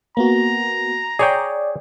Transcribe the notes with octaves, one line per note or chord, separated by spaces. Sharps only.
A#3 B3 F#4 A#5
G#4 C#5 D5 G5